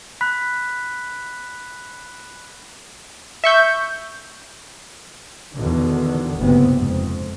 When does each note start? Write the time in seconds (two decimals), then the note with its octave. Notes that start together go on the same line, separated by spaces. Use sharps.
0.21 B5 F#6 B6
3.44 E5 C#6 G6
5.55 E2 B2 D3 D#3
6.37 F#1 D2 G2 C3 B3
6.73 F2 G#2